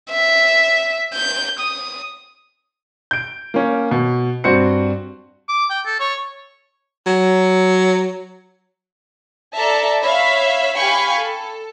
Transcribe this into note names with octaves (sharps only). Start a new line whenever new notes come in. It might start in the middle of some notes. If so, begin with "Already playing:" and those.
E5
G6
D#6
G6 D7
A#3 C#4
B2
G2 C4 F#4 C5 C#7
D6
G5
A4
C#5
F#3
A4 D5 E5 A5 A#5
C#5 E5 F5 B5
G4 F5 G5 G#5 B5 C#6
A4